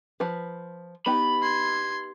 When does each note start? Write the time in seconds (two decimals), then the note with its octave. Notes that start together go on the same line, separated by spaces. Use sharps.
0.20 F3 B4
1.06 B3 D#4 G4 B5
1.43 C6 G#6